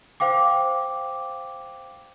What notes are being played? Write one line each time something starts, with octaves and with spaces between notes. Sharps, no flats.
C5 F5 G5 D6